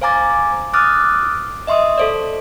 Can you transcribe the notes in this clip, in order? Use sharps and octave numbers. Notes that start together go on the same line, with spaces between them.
C5 F5 G#5 A#5 D6 A6
D6 D#6 F6 F#6 A6
D#5 E5 C6 C#6 D#6
A4 C5 D5